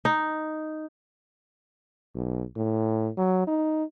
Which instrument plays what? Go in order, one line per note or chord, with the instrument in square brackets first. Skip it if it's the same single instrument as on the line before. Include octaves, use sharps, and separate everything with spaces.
[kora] D#4
[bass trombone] B1
A2
F#3
D#4